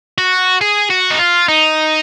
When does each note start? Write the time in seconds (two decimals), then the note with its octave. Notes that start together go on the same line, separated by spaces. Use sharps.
0.18 F#4
0.61 G#4
0.90 F#4
1.11 D#4
1.19 F4
1.48 D#4